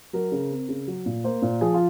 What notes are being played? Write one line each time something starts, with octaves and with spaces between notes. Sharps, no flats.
F#3 A#4
C#3
C4
C#3
F#3
A#2
A#3 C5
A#2
F3 G#4
F4